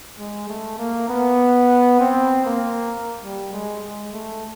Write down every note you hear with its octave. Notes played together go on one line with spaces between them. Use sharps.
G#3
A3
A#3
B3
C4
A#3
G3
G#3
G#3
A3